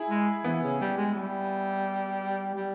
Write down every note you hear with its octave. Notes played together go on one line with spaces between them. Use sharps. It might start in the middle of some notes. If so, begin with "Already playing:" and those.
Already playing: E4 G#4
G#3
E3 B3
C#3
G3
G#3
G3
G3